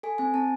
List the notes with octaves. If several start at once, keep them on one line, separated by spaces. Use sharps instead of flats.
A4 G#5
C4 G#5
C4 A5